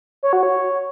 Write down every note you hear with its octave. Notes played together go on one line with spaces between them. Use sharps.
C#5
F#4
C#5